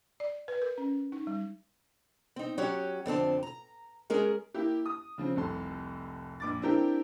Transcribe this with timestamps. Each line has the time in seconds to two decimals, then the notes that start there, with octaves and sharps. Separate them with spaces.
0.20 D5
0.48 B4
0.62 A#4
0.78 C#4
1.12 D#4
1.27 G3
2.36 C4 D#4
2.58 F#3 C#4 F#4 G4 C#5
3.06 F2 D3 C4 A5
3.43 A#5
4.10 G#3 C#4 G#4 A#4
4.54 A#3 E4 G4
4.86 D#6
5.18 C#3 F3 C4
5.36 F1 C2 A4 C6
6.40 A#1 D6 A6
6.62 C4 D4 E4 G4 A#4 G5